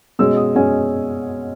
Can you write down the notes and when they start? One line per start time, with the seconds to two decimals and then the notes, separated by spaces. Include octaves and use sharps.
0.19 B2 G#3 C#4 E6
0.36 D#6
0.55 B2 G#3 C#4 G#5